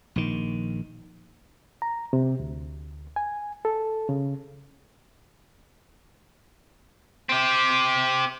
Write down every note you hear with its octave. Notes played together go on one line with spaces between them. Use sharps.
A#1 D#3
A#5
C3
D2
G#5
A4
C#3
C4 G4